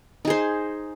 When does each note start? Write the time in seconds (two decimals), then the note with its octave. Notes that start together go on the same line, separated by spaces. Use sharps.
0.25 D#4
0.27 G#4
0.30 C5